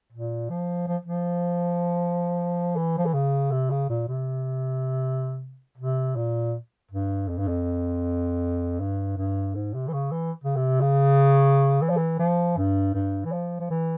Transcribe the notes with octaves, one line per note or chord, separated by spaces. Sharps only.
A#2
F3
F3
F3
E3
F3
E3
C#3
C3
C#3
A#2
C3
C3
A#2
G2
F2
G2
F2
G2
G2
G#2
C3
E3
C#3
E3
C#3
C3
C#3
E3
F3
E3
F3
G2
G2
E3
F3
F3
E3